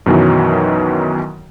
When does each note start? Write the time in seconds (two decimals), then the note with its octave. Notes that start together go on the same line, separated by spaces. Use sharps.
0.06 F#2 B2 D#3 E3 F#3